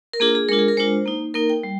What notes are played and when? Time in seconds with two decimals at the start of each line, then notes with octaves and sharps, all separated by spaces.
0.13 A#4
0.20 A#3 D4 F4 G#4
0.35 G#4
0.48 G#3 D4 F4 A#4
0.59 G#4
0.68 A#4
0.77 G#3 D4 F4 C5
1.06 A#3 D#4
1.34 A#3 D#4 A#4
1.50 G5
1.63 G3